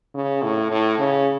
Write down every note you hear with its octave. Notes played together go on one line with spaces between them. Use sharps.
C#3
A2
A2
C#3